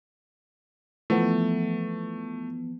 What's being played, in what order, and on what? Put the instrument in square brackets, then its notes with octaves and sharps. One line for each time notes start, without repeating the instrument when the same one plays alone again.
[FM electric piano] E3 F3 B3 [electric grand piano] A3